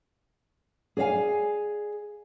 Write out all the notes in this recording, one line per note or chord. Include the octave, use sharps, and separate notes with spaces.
G#4 D5 D#5 F5 G#5